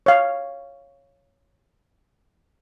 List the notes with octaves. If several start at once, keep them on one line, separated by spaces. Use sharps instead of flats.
C#5 F5